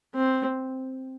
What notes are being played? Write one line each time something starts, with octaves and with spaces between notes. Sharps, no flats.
C4